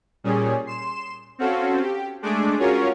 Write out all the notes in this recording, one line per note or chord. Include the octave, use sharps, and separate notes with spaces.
A#2 G3 C#4 G#4
C6 E7
C4 C#4 F#4 A4 F5
G4
G#3 A3 D4 G#4 D6
C#4 F4 F#4 G#4 A#4 C#5